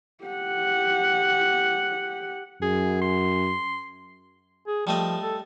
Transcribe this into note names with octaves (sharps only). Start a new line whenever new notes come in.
G4 F#5
F#2 G#4
C6
G#4
F3 G3 A3 D#5
A4